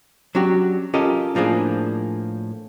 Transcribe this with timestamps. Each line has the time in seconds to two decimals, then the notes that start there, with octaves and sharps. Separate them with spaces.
0.35 F#3 C#4 D4 F#4 G4
0.94 C#4 F4 G4 A4 A#4 D#5
1.35 A2 F3 A#3 D4 G#4